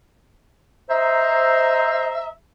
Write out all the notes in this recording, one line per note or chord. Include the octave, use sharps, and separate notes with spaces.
C5 D#5 E5 A#5